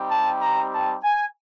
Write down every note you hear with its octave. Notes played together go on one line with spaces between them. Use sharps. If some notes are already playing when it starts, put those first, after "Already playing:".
Already playing: G3 C4 D#4 G4
A5
A#5
A5
G#5